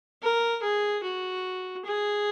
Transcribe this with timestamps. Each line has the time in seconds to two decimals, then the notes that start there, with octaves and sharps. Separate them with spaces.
0.22 A#4
0.63 G#4
1.03 F#4
1.84 G#4